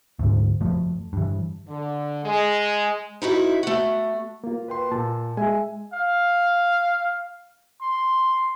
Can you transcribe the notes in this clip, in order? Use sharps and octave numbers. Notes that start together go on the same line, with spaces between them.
D2 G#2
F#2 F3 A3
G2 E3
D3
G#3
D#4 E4 F#4 B4
A3 F#4
A#3 F4
B4 G5 C6
A#2 A5
G#3 E5 G#5
F5
C6